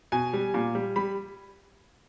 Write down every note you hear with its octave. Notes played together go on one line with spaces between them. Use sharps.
B2 G#5
G3
A#2
G3
G3 B5